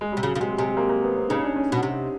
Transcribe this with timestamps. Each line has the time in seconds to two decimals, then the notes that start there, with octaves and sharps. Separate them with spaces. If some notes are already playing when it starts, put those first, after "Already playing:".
0.01 G#3
0.12 C3 G3
0.23 C#3 F#3
0.35 C#3
0.40 C3 G#3
0.58 C3 G#3
0.77 A#3
0.89 A#3
1.03 B3
1.16 C4
1.29 C#3 D#4
1.44 D4
1.56 C#4
1.72 B2
1.83 C3